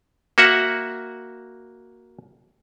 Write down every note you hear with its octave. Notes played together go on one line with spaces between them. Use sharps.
A#3 F#4 E5 F#5